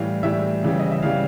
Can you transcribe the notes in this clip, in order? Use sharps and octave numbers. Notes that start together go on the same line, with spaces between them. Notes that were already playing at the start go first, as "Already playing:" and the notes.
Already playing: A2 E3 G3 F5
A2 E3 G3 E5
C#3 E3 G3
D#5
E5
C#3 E3 G3 F5